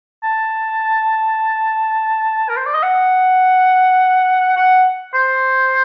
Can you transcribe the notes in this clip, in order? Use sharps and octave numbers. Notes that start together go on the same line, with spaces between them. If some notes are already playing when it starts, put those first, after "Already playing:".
A5
A#4
C5
D5
D#5
F#5
F#5
C5